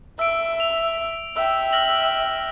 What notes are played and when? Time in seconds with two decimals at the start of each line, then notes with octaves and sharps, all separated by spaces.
0.19 E5 E6 D7
0.60 F7
1.37 E5 G5 E6
1.73 F6 A#6 F#7